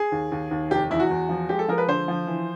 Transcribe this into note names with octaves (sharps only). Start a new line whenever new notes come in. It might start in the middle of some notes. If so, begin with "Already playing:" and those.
Already playing: G#4
D#2
D#2
D#2
F1 G4
E2 E4
F#4
E2
F3
G#3 G4
A4
F3 A#4
B4
D3 C5
F3
E3